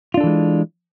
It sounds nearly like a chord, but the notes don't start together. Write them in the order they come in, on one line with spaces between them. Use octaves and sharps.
F4 D4 A4 E3 G#3